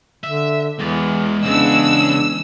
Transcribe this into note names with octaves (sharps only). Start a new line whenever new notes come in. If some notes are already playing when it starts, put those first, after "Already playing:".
D3 E5
E2 E3 G#3 D5
E2 C#3 G#3 B3 D4 E6